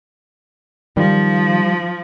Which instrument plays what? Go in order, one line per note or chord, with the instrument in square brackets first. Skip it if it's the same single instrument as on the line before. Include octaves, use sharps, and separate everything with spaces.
[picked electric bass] D#3 [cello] F3 [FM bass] G3